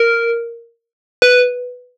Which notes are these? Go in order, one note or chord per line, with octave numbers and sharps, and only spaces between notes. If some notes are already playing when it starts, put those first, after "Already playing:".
Already playing: A#4
B4